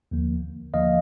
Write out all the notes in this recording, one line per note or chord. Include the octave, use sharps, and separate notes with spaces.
D#2 D3 F3 A#3
D#2 D3 F3 A#3 D#5 F5